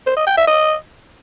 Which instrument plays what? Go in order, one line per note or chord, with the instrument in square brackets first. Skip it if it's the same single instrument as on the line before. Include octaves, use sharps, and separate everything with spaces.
[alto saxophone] C5
D#5
G5
E5
D#5